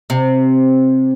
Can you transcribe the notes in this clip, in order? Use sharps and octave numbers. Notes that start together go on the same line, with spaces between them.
C3